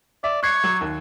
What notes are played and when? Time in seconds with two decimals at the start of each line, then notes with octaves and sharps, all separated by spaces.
0.24 D5 E5
0.43 C#6 F#6 G#6 C7 C#7
0.64 F#3
0.81 D#2